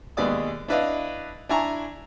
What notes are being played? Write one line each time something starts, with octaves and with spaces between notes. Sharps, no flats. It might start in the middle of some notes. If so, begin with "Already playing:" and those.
D#2 B2 G#3 B4 D5 D#6
D4 E4 B4 D5 D#5 F5
D4 E4 G#5 A#5 C#6